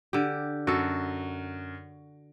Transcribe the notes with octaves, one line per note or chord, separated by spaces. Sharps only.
D3 G4
F#2 F#4 A4